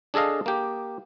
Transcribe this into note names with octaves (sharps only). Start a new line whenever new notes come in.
D4 G#4 A4 D#5 F5
A#3 G4